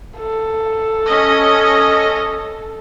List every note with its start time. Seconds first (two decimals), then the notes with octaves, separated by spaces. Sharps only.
0.17 A4
1.07 C#4 D#5